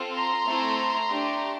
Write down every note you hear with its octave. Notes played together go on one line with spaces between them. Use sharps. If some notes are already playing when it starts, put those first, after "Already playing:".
Already playing: C4 F4 A4
A#5 C6
A3 C4 E4 A4
A3 D4 G4